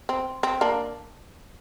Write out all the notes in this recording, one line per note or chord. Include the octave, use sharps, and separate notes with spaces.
C4
C4
A#3 D4